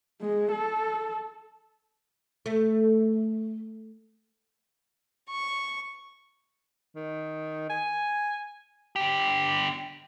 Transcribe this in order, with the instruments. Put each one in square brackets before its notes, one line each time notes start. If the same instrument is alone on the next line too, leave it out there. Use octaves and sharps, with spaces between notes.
[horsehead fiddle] G#3
A4
[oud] A3
[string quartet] C#6
[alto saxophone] D#3
G#5
[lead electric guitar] D3 G4